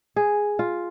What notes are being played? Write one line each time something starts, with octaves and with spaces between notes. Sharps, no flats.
G#4
F4